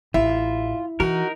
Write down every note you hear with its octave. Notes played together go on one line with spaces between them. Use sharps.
A1 E4 F4 E5
E3 D#4 F#4 A#4